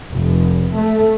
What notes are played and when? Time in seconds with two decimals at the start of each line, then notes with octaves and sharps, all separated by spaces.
0.12 F1
0.73 A3